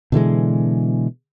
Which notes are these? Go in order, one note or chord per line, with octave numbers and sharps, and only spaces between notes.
B2 D3 E3 G#3